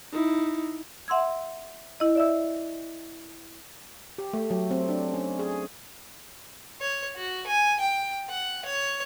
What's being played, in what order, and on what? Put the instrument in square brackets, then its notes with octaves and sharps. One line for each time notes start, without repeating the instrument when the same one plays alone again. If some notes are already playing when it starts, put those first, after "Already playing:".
[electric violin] D#4 E4
[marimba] E5 F#5 C6 E6 G#6
E4 D#5
D5 E5 E6
[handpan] G4
A3
F#3
C4
D4
C#4
G#4
[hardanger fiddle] C#5
F#4
G#5
G5
F#5
C#5